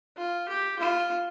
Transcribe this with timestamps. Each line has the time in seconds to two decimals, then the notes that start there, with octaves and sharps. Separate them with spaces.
0.17 F4
0.49 G4
0.79 F4